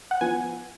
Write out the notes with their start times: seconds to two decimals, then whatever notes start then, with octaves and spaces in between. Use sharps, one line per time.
0.11 F#5
0.21 F3 B3 G#5